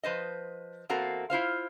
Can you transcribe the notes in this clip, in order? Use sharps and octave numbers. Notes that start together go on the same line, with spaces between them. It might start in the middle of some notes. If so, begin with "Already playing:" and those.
F3 B4 C5 D#5
E2 A#3 C4 F#4 A4 A#5
E4 F4 C5 F5